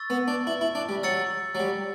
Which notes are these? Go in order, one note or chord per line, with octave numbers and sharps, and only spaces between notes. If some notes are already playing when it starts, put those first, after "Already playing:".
Already playing: C#6 E6 A6
B3
D4
E4
E4
D4
G3
F#3 E6 A6 C#7
F#3
G3